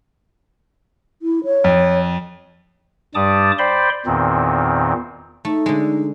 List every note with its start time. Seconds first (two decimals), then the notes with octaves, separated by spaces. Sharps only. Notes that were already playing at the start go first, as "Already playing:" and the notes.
1.22 E4
1.45 C#5
1.64 F2
3.15 G2 G3 D5 A5 D6 D#6
3.59 C5 D5 G5 B5 C6
4.06 E2 A#2 D#3 C4
5.45 A3 D#4
5.66 D3 G#3